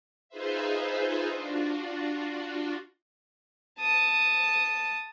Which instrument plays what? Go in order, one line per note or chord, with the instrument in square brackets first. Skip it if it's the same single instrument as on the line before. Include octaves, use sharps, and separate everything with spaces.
[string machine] D#4 F4 G#4 B4 C5 E5
D4 F4 F#4
[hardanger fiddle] A5 D#6